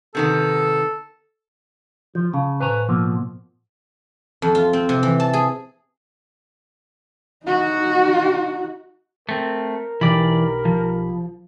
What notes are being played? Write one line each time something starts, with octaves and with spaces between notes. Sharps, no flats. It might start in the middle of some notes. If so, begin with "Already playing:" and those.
C3 D#3 B3 A4
F3 G6
C#3 F5 A5
A2 B4 C5 G#5 A#5 C#6
B2 F3 A#3 E6
F2
F4
C4
C3
E3
A5
G#4
D#4 F#4
A3 C4 A#4
B1 E3 G4 D5 B5
F3